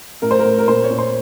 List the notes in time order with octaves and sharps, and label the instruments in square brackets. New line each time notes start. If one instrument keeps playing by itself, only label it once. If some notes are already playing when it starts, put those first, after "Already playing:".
[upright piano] A2 A#4
C5
A#4
A2
A#4
A#2 C5
C#5
A#2
C5